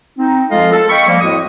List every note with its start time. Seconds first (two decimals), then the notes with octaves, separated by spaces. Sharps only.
0.19 C4 D#4
0.51 F3 G#3 F4 A4 D#5 F5
0.73 A4
0.90 D#5 F5 G5 B5 C#6
1.07 F3 G3 A#3
1.21 F2 A2 G#3 F#4 D#6